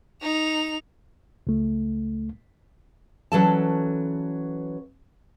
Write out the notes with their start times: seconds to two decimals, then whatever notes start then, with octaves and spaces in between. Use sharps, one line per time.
0.22 D#4 F7
1.47 C#2 A3
3.32 E3 F#3 C#4 A4 D5 A5